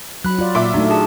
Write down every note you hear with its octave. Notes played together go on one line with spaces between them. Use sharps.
F#3 B5 F#6
F4 D5
A#2 E5 D6
A3 D4 D#4 F#4
G#4 A5